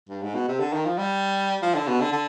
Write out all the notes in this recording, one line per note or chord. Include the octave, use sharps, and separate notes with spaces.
G2
G#2
B2
C3
D3
D#3
F3
G3
F3
D3
B2
D3
D3